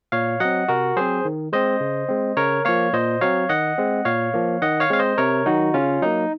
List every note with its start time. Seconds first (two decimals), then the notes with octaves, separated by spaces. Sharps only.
0.12 A#2 C#5 F5
0.40 F#3 C4 D#5 F#5
0.68 C3 F#4 A#4
0.97 F#3 C4 G#4 C5
1.25 D#3
1.53 G#3 C4 C5 D#5
1.81 C#3
2.09 G#3 C4
2.37 C#3 A#4 C#5
2.65 F3 A#3 C#5 F5
2.93 A#2 C5 D#5
3.21 F#3 C4 C#5 F5
3.49 D#3 D#5 F#5
3.78 G#3 C4
4.05 A#2 C#5 F5
4.34 F3 A#3
4.62 D#3 D#5 F#5
4.80 C#5 F5
4.90 G#3 C4 F5
4.99 C5 D#5
5.18 C3 A#4 C#5
5.46 D#3 F#3 D#4 F#4
5.74 C#3 C#4 F4
6.02 F#3 A#3 D#4